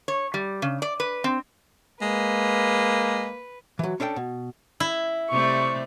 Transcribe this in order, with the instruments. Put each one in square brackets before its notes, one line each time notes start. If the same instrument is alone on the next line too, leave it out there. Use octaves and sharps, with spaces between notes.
[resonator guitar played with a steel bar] C#5
G3
C#3
D5
B4
C4
[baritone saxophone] G#3 [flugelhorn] A#3 [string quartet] B4
[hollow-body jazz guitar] E3 F#3
C#4 D4 A4 E5 G5
B2
[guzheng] E4
[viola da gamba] C3 G3 A3 [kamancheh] C#6